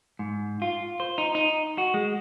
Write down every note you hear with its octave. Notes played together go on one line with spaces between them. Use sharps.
G#2
F4
C5
D#4
D#4
F#4
G#3